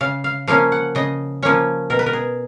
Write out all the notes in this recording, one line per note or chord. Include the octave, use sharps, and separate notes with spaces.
C#3 F5
F5
F3 A#3 C#4 F5
F#5
C#3 D#5
F3 A#3 C#4 C#5
B2 A#4
B4
A#4
G#4